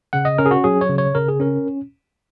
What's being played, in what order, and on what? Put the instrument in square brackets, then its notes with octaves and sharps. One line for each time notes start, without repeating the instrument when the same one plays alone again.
[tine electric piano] C#3 F#5
D#5
C#4 A#4
G#4
F#4
F#3 G#4
C#5
C#3
C#5
C#3 A#4
G#4
C#4 A#4